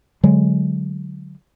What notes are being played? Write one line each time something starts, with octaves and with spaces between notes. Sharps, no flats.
D3 F#3 G#3